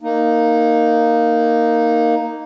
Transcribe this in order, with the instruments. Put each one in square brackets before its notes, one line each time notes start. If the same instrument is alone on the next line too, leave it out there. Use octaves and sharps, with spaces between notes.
[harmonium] A#3 D#4